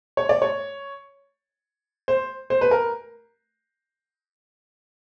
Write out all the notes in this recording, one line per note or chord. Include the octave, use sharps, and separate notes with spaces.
C#5
D5
C#5
C5
C5
B4
A#4